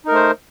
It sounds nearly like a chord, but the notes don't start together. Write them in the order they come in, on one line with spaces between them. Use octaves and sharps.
D#4 A#4 A3 C5